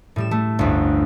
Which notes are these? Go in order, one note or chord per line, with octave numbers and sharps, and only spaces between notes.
A2 G3 E7
A3
G1 D2